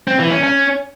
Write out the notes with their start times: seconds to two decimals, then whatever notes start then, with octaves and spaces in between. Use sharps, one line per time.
0.08 C4
0.20 E3
0.32 C#4
0.43 C#4